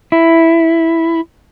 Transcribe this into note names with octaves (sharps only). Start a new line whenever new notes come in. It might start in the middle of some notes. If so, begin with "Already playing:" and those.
E4